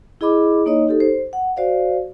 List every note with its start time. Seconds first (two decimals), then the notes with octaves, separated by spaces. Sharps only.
0.21 E4 G#4 D#5 B5 D6
0.66 A#3 D#4 C#5 D#5
0.87 D#4 G4 A4
1.00 C5
1.33 F#5
1.57 F#4 C5 D5 F5